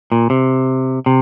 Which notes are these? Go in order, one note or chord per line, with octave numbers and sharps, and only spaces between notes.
A#2
C3
C3